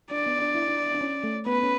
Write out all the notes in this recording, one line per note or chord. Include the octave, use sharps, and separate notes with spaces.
D4 D5
B3
D4
E4
D4
D4
C#4
A3
B3 B4
C#4